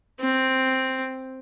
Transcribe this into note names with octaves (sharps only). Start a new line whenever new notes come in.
C4